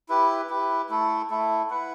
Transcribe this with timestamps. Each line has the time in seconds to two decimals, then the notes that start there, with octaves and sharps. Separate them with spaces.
0.09 E4 G4 B4
0.50 E4 G4 B4
0.90 A3 E4 A4
1.30 A3 E4 A4
1.70 E4 B4 F#5